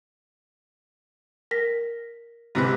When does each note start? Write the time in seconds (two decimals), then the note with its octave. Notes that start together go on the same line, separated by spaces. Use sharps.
1.51 A#4 A#6 B6
2.55 G#2 C3 B4